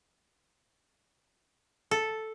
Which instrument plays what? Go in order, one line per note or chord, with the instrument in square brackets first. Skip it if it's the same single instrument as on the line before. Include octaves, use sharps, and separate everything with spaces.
[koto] A4